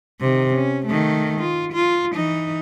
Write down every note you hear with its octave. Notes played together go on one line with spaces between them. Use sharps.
C3 D#3
C#4
D#3 A3
F4
F4
E3 D#4